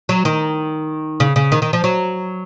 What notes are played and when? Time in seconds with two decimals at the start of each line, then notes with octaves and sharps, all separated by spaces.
0.09 F#3
0.25 D#3
1.20 C#3
1.36 C#3
1.52 D#3
1.62 D#3
1.73 F3
1.84 F#3